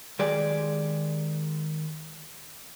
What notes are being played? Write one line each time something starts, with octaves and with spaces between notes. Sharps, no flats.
D#3 G#3 G4 G#4 D5